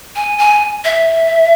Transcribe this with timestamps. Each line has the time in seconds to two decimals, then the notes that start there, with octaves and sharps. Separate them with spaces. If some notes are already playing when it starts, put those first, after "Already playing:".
0.16 G#5
0.39 G#5
0.85 E5